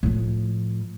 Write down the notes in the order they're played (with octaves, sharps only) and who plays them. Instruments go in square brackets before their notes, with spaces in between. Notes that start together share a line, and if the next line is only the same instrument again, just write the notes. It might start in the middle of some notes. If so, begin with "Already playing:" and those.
[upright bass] A2 F3